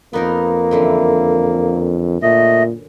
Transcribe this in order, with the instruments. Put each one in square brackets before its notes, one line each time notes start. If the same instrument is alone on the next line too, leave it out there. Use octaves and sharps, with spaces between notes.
[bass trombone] F2 [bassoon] A#3 [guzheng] B3 D#4 A#4
[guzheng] F#2 D3 E3
[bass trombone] A#2 [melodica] A3 D#5